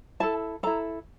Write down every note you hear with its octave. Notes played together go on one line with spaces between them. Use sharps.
E4 A4 A5
E4 A4 A#5